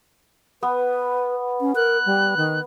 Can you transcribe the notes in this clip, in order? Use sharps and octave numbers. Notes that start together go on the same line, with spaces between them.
B3 B4
C#4
A#4 F#6
G3
D#3